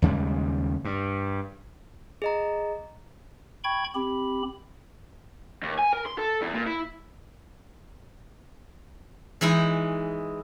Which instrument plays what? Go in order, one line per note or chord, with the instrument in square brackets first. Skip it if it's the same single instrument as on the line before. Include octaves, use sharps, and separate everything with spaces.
[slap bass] D#2 C#3 G3 G#3
G2
[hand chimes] G#4 D#5 A#5
[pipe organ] G5 B5 C#6 G#6
C4 G4 B5
[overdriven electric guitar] D#2
G#5
A#4
C6
A4
E2
A#2
E4
[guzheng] E3 G#3 D#4 E4